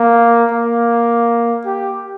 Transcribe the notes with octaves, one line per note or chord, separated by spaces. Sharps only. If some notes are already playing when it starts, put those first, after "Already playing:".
Already playing: A#3
A#3
G4